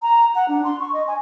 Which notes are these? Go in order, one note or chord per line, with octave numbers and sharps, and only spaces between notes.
A#5
F#5
D4
C6
C#6
D#5
G#5